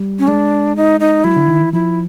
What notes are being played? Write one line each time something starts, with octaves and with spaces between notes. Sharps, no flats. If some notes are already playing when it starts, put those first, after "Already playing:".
Already playing: G3
C#4
G#3 D4
D#4
D#4
F#3 E4
D3
D#3
E3
F3 E4